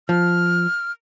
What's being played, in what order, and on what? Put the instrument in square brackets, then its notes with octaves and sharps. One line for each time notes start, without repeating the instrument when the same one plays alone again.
[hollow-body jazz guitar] F3 [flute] F6